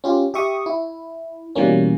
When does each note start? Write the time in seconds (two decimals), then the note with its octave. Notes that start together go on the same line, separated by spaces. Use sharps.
0.04 C#4 F4 G4
0.34 G4 E5 C#6 D#6
0.66 E4
1.55 B2 E3 G3 A#3 C#4